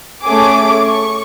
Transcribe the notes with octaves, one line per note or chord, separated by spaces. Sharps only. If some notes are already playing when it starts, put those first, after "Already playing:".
A3 C#4 G#4 D6
C#6